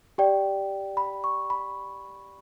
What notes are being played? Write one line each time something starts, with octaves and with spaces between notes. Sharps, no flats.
G4 D5 G5
B5
C#6
B5